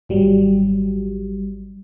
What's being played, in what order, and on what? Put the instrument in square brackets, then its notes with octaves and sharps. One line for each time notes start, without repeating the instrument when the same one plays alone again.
[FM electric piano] G#1 F#3 G3